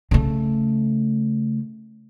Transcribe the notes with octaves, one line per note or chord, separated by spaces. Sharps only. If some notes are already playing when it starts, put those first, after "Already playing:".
C#3 A3